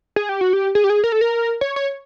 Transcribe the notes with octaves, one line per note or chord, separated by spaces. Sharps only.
G#4
G4
F#4
G4
G#4
G4
G#4
A#4
A4
A#4
C#5
C#5